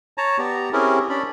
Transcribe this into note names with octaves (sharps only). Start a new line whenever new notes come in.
C#5 A5 A#5
B3 G4 D5 A#5
C4 C#4 E4 G4 G#4 A#4
C#4 D4 D5 B5